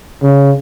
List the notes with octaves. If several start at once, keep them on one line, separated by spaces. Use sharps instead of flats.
C#3